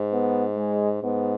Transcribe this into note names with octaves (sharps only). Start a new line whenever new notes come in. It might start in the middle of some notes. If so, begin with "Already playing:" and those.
Already playing: G#2
B3
G#3
G#2 B3